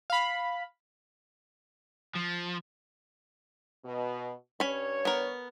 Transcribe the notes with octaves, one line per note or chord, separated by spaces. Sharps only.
F5 B5
F3
B2
G2 C#4 C#5 B5
B3 A#4